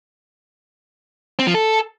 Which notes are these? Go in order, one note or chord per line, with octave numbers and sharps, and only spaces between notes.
C4
F3
A4